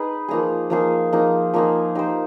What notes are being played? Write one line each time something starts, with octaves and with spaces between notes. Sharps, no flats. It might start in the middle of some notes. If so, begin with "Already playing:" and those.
Already playing: D#4 G#4 B4
F3 A#3 D#4 G#4
F3 A#3 D#4 G#4
F3 A#3 D#4 G#4
F3 A#3 D#4 G#4
D#4 G4 C5